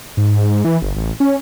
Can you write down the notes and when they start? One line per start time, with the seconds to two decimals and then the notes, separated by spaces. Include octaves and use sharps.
0.17 G#2
0.65 E3
0.82 G1
0.96 A1
1.20 C#4